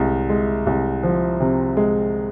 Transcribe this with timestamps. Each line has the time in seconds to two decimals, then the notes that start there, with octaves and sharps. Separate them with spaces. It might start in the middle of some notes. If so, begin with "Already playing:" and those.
Already playing: C2 G#3
0.29 G#3
0.67 C2
1.03 F3
1.40 C3
1.77 G#3